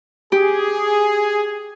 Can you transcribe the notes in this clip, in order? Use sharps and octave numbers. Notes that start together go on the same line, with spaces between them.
G4 G#4